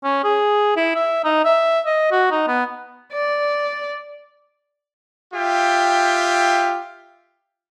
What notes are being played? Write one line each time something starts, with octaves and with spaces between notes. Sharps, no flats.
C#4
G#4
E4
E5
D#4
E5
D#5
F#4
D#4
B3
D5
F4 G4 E5 G5